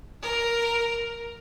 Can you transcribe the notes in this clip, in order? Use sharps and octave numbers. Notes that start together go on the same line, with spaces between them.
A#4